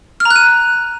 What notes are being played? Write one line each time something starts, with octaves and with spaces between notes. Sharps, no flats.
F6
A#5
F#6
D#7